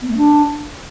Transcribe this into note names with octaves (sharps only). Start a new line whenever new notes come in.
B3
A3
D4